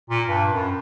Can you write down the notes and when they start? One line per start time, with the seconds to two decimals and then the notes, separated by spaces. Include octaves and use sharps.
0.10 A#2
0.29 G2
0.52 F#2